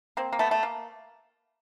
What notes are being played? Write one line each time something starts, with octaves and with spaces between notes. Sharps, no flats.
A#3 C4
A#3
A3 B3
A3
A#3